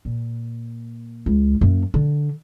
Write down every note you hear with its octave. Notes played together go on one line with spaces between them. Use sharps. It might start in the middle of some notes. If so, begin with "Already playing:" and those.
A#2
C#2
F#2 A#3
D3